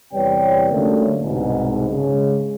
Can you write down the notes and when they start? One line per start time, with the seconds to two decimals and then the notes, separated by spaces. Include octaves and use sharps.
0.13 E2 C3 G3 B4 C#5 G5
0.71 D3 F#3 G3 A3 A#3 C#4
1.21 C2 G#2 B2
1.88 C#3 G#3